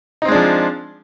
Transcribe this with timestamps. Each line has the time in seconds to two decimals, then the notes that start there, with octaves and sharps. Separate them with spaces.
0.22 D#4
0.25 C4
0.28 G#3
0.32 D4
0.35 F3